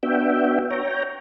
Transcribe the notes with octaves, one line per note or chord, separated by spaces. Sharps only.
B3 D4 F#4 E5 G5
C#5 G5 A#5